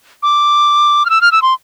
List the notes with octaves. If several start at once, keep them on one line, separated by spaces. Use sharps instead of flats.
D6
F6
E6
F6
E6
C6